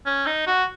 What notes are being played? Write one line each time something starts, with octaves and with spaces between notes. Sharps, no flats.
C#4
D#4
F#4